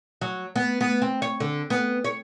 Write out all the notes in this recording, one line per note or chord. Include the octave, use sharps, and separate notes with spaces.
F#3
B3
B3
C4
C#5
D3
B3
C#5